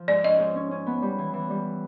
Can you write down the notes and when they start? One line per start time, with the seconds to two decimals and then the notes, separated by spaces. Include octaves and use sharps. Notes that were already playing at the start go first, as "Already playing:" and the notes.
Already playing: F3
0.08 G#2 D5
0.24 C#4 D#5
0.39 G#2
0.55 C#4
0.71 C#4
0.86 B3
1.02 G3
1.18 E3
1.33 E3
1.50 G3